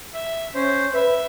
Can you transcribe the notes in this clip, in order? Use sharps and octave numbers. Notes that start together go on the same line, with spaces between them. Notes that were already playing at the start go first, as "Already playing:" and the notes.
E5
C#4 C5
B4 E5